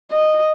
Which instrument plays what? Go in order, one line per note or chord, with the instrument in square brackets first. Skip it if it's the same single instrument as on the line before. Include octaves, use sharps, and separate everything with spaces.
[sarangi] D#5